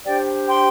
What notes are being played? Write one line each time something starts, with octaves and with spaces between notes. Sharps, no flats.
D4 G4 C5 D5 G5
G5 C6